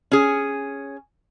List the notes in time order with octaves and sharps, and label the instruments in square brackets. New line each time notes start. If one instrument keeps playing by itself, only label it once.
[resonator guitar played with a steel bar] C#4 G#4